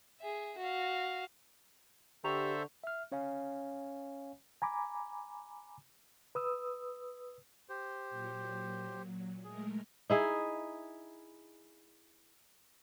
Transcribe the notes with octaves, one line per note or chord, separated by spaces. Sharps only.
G#4 E5
F#4 F5
D3 G4 A4 C5 E5 A#5 C#6 F7
E5 F6
C#4 C#5 F5 G#5
G#5 A#5 B5 D6
B4 D#6 E6
G4 C5
A#2 F#3
G#3 A3 G#4 A#4
D#4 E4 G#4